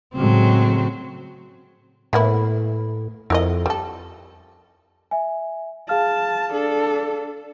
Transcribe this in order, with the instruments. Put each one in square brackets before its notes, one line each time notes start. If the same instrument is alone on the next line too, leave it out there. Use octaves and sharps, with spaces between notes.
[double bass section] A2 C#3 G#3 [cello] F#3 C4
[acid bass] A2 [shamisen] A#3 B3 E4
[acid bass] F2 [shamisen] E4 A#4 D#5
[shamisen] G3 A4
[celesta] E5 G#5
[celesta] G#4 F5 F6 [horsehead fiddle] A5
[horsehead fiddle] D4 A4